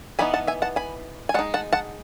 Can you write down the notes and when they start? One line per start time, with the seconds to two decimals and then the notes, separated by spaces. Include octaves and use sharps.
0.19 E3 B3 D#4 G#5 B5
0.33 F#5 A5
0.47 E5 G#5
0.62 F#5 A5
0.76 G#5 B5
1.29 G#5
1.34 G#3 F#5 A5
1.39 D#4
1.54 F#5 A5
1.73 F#5 A5